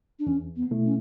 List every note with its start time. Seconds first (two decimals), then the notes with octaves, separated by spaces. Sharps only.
0.19 D4
0.27 E2 C#4
0.56 B3
0.71 B2 A3 E4
0.85 C#4